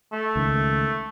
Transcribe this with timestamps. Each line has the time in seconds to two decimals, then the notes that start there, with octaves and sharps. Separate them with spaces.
0.13 A3
0.36 C#2 D#3